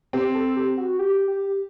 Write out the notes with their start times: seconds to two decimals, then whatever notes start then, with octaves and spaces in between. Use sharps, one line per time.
0.13 C4 G4
0.35 A4
0.56 G4
0.77 F#4
0.99 G4
1.28 G4